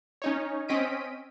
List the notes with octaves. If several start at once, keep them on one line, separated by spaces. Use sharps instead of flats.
C#4 D#4 C#5
C4 C#4 D#5 B6 D7 D#7